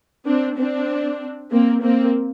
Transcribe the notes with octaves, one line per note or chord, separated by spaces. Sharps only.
C4 D4
C4 D4
A#3 C4
A#3 C4